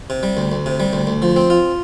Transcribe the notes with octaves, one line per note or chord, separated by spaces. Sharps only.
C3
G3
D2
D2
C3
G3
D2
D2
F3
C4
F4